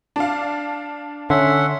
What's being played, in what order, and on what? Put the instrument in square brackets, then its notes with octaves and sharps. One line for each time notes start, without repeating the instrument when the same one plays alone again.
[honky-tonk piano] D4 F5
[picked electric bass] D3 [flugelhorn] C#4 [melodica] E5 F#5 C6